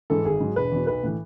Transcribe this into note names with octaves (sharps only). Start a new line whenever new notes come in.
G#2 E3 A4
G#1 G#4
G#2 F#3
E1 B4
E2 B2
B1 B4
A2 E3